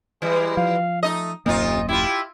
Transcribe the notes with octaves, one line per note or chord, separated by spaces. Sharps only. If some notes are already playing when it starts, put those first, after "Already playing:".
E3 G3 G#3
F3 F5
A3 D#4 D#5
D#1 F#2 C3 A#3 D#4 F4 D#5
E4 F4 G4